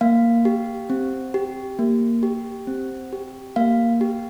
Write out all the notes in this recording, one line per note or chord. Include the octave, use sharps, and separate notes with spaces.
A#3 F5
G4
C4
G4
A#3
G4
C4
G4
A#3 F5
G4